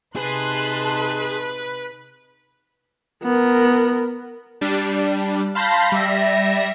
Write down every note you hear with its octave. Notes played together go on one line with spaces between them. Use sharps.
C3 D#4 G#4 B4 A5 C6 F#6
B3 A#4
G3 D4
F5 A5 B5 C6 G6 A#6
G3 E5 A#6